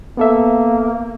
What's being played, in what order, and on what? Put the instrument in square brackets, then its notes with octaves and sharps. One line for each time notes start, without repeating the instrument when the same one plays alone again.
[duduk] A#3 [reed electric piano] B3 A4 E5